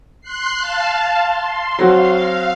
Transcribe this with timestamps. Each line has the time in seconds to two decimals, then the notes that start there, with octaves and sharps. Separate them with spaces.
0.21 C6 F#6 C7
0.59 F5 A5
1.24 C6
1.79 F#3 C4 F#4 F5